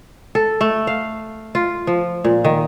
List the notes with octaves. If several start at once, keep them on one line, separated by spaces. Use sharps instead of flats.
A4
A3
F5
F4
F3
A#2
D#3